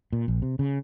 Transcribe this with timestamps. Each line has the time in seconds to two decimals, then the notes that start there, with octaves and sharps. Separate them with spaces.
0.13 A#2
0.28 A#1
0.42 C3
0.59 C#3